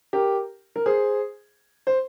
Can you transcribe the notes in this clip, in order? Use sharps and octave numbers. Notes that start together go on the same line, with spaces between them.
G4 A#4
A#4
G#4 C5
C5